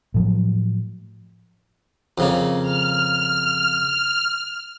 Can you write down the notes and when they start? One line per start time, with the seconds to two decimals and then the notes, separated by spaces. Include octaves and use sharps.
0.14 A2 F3 F#3
2.18 F2 C#3 A#3
2.62 F6